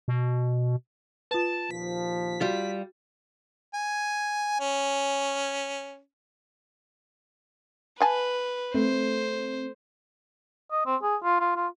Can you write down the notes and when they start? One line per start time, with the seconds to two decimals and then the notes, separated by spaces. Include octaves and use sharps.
0.08 B2
1.31 F4 B4 A5
1.71 D#2 A#2 F3 B6
2.41 G3 F4 F#4
3.74 G#5
4.60 C#4
8.00 B4 F5 G#5 A5
8.74 A3 C4 C5
10.71 D#5
10.86 C4
11.03 G#4
11.23 F4
11.40 F4
11.56 F4